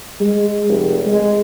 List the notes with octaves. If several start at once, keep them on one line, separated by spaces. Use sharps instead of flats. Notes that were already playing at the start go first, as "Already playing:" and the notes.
G#3
F1
G#3